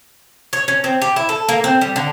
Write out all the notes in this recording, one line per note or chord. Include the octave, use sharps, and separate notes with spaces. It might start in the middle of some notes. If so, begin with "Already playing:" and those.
C#5
C#4
C4
G4
E4
A4
A#3
C4
G3
D3